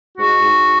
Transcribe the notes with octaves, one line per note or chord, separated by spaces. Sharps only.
G#2 F#4
G#2